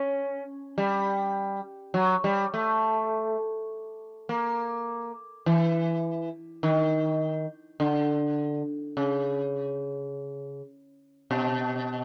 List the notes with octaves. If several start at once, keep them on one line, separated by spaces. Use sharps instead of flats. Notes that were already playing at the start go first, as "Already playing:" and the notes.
Already playing: C#4
G3
F#3
G3
A3
A#3
E3
D#3
D3
C#3
B2